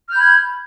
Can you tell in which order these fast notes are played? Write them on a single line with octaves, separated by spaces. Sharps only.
F6 G6 B5 G#6